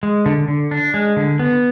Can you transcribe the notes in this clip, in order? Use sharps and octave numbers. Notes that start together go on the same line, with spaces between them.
G#3
D3
D3
D4
G#3
D3
B3